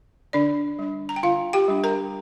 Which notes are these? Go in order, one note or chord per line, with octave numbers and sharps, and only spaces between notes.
D3 D4 D5
G3 D4
A#5
G5
D3 F4 F5
G4 G5
G3 D4
A#4 A#5